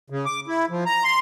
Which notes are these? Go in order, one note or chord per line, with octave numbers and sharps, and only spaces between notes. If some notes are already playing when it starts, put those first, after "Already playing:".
C#3
D6
E4
F3
A#5
C6